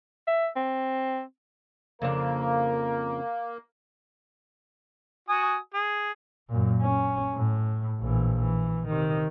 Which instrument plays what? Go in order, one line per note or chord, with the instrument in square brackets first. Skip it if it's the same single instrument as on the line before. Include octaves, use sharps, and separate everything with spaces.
[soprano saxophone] E5
C4
[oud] F2 C#3 D4 [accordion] A#3 [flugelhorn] A#4
[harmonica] F#4 G#5 D#6
G#4
[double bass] F#2 A#2
C#4
A2
A#1 E3
E3
C3 D#3